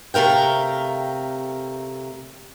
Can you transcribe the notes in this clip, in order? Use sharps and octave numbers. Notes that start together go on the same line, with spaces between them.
C3 A3 A#4 F5 G5